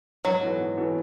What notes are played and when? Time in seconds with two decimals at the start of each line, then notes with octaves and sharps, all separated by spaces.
0.25 G#2 F#3
0.41 E3 B3 F#4 A4
0.59 G#2
0.77 E3 B3 F#4 A4